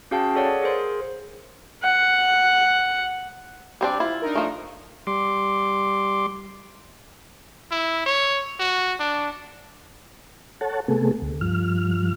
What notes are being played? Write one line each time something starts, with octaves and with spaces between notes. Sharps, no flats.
C#4 F#4 G#4 F5 G5 A5
G#4 A4 C#5 D5 F#5
G#4 A#4 C5 C6
F#5
G3 C4 D4
E4 F4
D4 D#4 A#4
F3 A3
G3 C6 D6
E4
C#5
F#4
D4
A4 C#5 F#5 A5
C3 A3 B3 G#4 A4
D2
G2 F3 F6